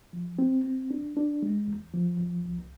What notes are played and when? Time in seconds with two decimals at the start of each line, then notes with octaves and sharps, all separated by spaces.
0.13 F3
0.39 C4
0.64 C4
0.91 D4
1.17 D4
1.42 G#3
1.68 E2
1.94 F3
2.20 E2
2.46 C2